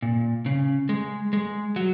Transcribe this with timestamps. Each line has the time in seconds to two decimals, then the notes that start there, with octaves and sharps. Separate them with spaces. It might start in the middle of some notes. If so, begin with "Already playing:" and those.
0.02 A#2
0.46 C#3
0.89 G#3
1.33 G#3
1.76 F#3